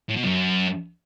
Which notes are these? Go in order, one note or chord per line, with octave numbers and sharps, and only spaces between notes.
A2
B2
F#2